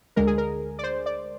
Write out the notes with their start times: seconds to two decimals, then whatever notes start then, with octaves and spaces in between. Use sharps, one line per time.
0.16 D2 D3 G#3 A#4
0.27 G#4
0.38 A#4
0.79 D5
0.83 C5
1.06 D5